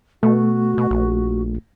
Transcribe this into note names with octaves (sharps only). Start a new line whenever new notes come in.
B2 A3 F#4
B2
A#1